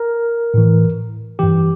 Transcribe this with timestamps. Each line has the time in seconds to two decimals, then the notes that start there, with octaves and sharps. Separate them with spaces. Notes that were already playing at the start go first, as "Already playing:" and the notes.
Already playing: A#4
0.54 A2 E3
1.39 G2 E3 G4